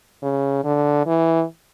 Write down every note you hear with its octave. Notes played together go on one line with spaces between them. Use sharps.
C#3
D3
E3